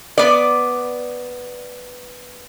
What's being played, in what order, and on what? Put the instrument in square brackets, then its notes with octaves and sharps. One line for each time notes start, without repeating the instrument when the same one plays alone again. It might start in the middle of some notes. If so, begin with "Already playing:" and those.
[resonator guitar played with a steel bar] B3 D5